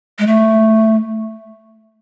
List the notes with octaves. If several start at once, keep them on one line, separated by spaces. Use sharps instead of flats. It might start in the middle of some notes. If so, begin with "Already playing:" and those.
G#3
A3